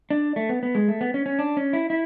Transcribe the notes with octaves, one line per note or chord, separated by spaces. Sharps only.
D4
A3
B3
B3
G#3
A3
B3
C#4
C#4
D4
C#4
E4
E4